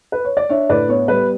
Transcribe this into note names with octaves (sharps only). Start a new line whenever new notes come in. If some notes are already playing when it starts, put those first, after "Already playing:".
B4
C#5
D5
D4 C#5 E5
A2 B4 D5
B3 C#5
G3 B4